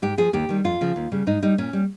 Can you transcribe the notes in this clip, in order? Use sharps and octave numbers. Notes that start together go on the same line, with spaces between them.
G#2 G4
F3 G#4
D#2 G4
D#3 G3
F2 F4
C#3 F3
D#2
C#3 G3
G#2 D#4
G3 D#4
A#2 C#4
G3